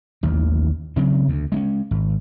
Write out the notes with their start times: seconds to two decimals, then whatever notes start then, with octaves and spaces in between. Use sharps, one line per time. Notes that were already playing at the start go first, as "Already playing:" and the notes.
0.23 A1 D#2 D#3
0.96 C#3 F#3 C4
1.28 D2
1.52 G#3 C4 C#4
1.91 G#1